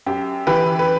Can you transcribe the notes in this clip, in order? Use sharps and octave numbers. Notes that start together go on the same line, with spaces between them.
F#2 G4
E3 G4 B4
B4